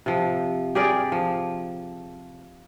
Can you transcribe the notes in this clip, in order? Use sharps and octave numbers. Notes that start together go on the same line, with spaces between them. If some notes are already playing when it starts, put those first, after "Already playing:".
C3 F3
G4 G#4 A#4 D5
F3